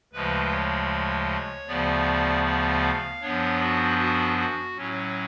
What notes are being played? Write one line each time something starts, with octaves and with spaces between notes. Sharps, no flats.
D2 C#3 F3 G#3 B4
C#5
D2 C#3 F3 B3 D5
D5
F5
F#2 F3 B3 D4 C#5
F#4
F#4
F#4
A2 F#3 C#4